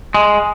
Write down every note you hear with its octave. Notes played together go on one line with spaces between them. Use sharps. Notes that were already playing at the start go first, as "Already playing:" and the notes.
G#3